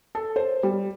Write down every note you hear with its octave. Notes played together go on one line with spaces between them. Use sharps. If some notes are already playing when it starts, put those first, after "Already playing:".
A4
C5
G3